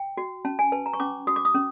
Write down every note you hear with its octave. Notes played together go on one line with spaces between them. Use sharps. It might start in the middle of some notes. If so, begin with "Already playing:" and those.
Already playing: G5
F#4
C#4 A5
G#5
B4 A5
A#5
C#6
C#4 D6
F#4 D#6
D6
D#6
C#4